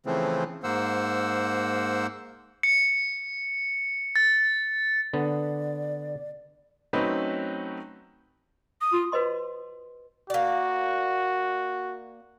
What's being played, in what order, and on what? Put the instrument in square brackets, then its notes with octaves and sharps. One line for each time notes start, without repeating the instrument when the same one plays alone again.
[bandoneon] C#3 E3 F3 A3 C4
G#2 A#3 C5 F#5 E6
[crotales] C#7
A6
[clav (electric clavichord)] D3 B3 [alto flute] D5
[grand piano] F#3 A3 C4 C#4 D#4 B4
[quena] D#6
[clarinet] F4
[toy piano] F#4 B4 C5 D#5 C6
[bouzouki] A#3 D5 [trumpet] F#4